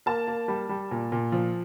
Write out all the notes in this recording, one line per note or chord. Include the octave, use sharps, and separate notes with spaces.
A#3 A5
A#3
G3
G3
A#2
A#2
F3